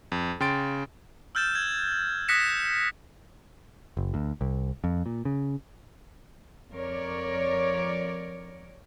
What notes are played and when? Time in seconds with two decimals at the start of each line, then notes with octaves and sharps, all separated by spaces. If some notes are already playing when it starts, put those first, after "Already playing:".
0.12 F2
0.40 C#3 G5 C6 A6 D7
1.35 E6 F6 G6 A6 E7
1.55 G#6
2.28 D#6 F#6 A#6 B6 C#7 E7
3.97 F#1
4.14 D2
4.41 C2
4.84 F2
5.06 A#2
5.25 C#3
6.72 F2 A#4 C#5 D5